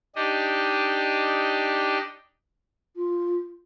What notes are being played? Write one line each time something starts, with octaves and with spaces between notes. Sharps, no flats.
D4 D#4 G4 D#5
F4